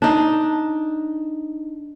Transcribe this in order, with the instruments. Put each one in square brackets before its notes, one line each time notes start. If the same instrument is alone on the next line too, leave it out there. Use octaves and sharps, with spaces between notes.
[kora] D4 D#4